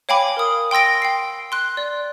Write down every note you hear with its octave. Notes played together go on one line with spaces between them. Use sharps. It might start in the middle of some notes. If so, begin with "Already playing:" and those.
C#5 F5 G5 G#5 B5 D6
A#4 D#6
G5 C6 E6 A#6 D7
G5 C7
C6 F#6
D5